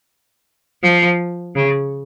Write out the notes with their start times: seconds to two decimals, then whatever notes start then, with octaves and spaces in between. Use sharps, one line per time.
0.83 F3
1.55 C#3